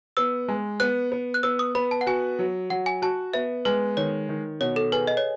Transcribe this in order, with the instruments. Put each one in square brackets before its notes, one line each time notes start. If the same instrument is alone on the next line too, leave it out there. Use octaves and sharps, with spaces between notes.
[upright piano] B3 [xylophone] E6
[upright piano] G#3
[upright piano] B3 [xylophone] F#6
[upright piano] B3
[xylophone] F#6
[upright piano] B3 [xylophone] E6
[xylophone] D#6
[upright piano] B3 [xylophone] B5
[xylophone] A5
F#5
[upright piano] F#4 [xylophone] G#5
[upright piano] F#3
[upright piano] F#3 [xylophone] F#5
[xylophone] G#5
[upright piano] F#4 [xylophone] A5
[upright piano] B3 [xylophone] E5
[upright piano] G#3 [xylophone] B4
[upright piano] D#3 [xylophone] C#5
[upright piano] D#3
[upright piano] B2 [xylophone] C#5
[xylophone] A4
[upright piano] G#4 [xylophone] B4
[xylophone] D#5
C#5